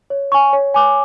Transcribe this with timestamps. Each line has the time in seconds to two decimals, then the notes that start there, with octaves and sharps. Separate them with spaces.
0.10 C#5
0.32 G#5 C#6
0.53 C#5
0.74 G#5 D6